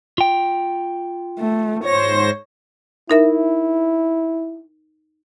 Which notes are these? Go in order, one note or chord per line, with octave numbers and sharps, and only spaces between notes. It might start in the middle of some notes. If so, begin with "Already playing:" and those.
F4 G5
A3
G#2 C5 C#5 A#6
D#4 E4 A#4 E5